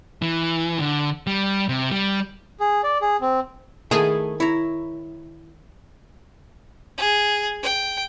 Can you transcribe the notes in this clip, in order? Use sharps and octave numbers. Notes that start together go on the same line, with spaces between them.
E3
D3
G3
C3
G3
G#4
D5
G#4
C4
D#3 A3 E4 G#4
E4 C#5 A#5
G#4
G5